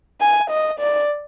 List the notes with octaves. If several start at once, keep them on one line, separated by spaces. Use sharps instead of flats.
G#5
D#5
D5